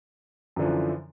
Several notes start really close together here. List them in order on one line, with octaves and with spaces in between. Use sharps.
F#2 D3 F3 E3